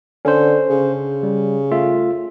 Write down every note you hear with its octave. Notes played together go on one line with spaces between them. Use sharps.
D3 C#4 C5
C#3
G3
A3 F4 E5